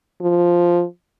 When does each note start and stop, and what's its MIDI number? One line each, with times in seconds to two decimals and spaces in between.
0.21 0.84 53